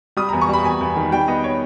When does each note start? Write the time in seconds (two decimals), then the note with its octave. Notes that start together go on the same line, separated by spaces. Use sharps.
0.17 G3 D#6
0.29 E2 A#5
0.41 C#6
0.49 G3 B5
0.64 E2 G#5
0.81 E2
0.96 D#3
1.12 G3 G5
1.28 B3 D#5
1.44 C#5